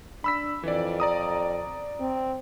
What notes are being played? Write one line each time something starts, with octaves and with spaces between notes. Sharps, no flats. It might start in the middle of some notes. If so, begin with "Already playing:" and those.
D4 B5 E6 B6
F2 E3 D5
D5 A#5 D#6
C4